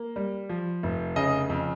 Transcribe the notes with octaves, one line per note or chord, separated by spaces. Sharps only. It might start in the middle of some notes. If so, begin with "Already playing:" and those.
Already playing: A#3
G3
F3
F1
C#3 D#5
F2